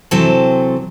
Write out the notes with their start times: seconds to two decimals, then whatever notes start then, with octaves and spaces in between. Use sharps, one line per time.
0.11 C3 E3 F#3 C4 A4 A5